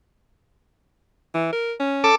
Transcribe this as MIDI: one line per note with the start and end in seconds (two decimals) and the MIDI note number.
1.34 1.52 52
1.53 1.73 70
1.80 2.10 61
2.04 2.15 69
2.04 2.15 86